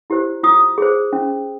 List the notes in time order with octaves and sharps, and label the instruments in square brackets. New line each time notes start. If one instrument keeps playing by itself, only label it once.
[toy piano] E4 G4 C5
F4 D#6
G#4 C5
C#4